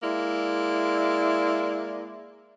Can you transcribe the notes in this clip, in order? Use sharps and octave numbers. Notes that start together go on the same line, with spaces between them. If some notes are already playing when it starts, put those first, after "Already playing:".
G#3 A#3 E4 D5